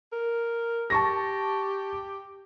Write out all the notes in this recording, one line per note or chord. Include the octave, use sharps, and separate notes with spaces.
A#4
G4 A5 C#6 A#6